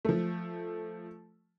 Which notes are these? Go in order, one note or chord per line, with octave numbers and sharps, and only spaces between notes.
F3 A3